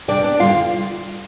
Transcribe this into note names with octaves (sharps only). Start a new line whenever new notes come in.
C3 G3 D4 D5
D4 D5
F2 D3 G3 F4 F5